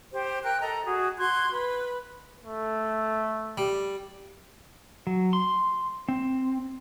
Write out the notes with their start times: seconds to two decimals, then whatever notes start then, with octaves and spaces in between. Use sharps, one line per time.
0.12 G4 C5
0.42 A#4 G5 F#6
0.60 A4 D#5 A#5
0.84 F#4 G#4
1.18 F#4 C6 F#6 G#6
1.50 B4
2.44 A3
3.58 G3
5.07 F#3
5.33 C6
6.09 C4